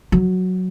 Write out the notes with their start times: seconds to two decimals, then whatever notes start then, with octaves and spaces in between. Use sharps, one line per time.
0.12 F#3